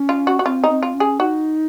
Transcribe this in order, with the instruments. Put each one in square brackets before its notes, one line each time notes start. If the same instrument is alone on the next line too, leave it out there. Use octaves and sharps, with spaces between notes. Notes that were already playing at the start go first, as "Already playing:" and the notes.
Already playing: [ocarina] C#4
[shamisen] F4
F#4
F#4
[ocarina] C4 [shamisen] F4
[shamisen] D#4
[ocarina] C4
[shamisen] F4
[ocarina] C#4
[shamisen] G#4
[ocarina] D#4 [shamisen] F#4